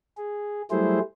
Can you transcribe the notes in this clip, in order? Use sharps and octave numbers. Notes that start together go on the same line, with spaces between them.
G#4
F#3 G3 A3 E4 G#4 C5